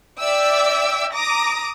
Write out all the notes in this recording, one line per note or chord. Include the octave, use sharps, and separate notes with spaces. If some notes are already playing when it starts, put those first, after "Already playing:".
D5 E5 G5 D6 E6
A#5 D6 D#6 A#6